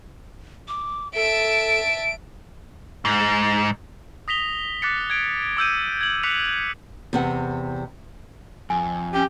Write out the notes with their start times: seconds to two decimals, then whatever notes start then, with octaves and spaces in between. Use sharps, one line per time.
0.68 D6
1.15 A4 E5 A5 D7
3.05 G#2
4.28 D#6 A#6 B6 F7 G7
4.82 D6 F#6 A6 B6 C#7
5.10 G#6 D7
5.57 D6 E6 G6 D#7
6.01 G#6 F#7
6.23 D6 E6 F#6 B6 C#7 F7
7.13 E2 C3 F#5
8.70 F2 G#5
9.14 C#4 G4